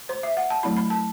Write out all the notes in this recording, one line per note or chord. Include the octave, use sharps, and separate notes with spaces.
C5
E5
F#5
A5
F#3 A3 C4 E4 B5
B5
A5